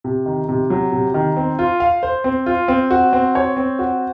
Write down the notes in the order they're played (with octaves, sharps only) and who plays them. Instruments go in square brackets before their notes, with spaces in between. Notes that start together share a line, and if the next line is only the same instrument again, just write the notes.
[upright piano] C3
D#3
C3
F#3
C3
D#3
C4
F4
F5
C5
C4
F4
C4
F#4
C4
C#5
C4
F#4